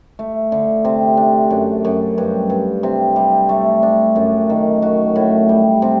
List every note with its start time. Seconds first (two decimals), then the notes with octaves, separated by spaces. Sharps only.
0.19 A3
0.52 D3
0.85 C3
1.17 D4
1.50 F#2
1.85 F#2
2.18 G2
2.50 G2
2.83 C3
3.16 G3
3.49 A3
3.83 D4
4.16 F#2
4.50 D#3
4.82 F#4
5.16 A2
5.49 G3
5.82 C3